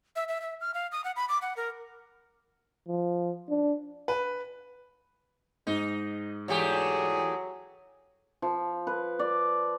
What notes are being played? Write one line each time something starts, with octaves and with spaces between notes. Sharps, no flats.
E5
E5
E5
F6
F5
D#6
F#5
B5
D6
F#5
A#4
F3
D4
B4
G#2 D#4
E2 F#3 A3 G4 G#4
F3
B4
D5